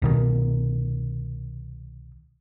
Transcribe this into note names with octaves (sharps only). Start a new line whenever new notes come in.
C2 B2 D#3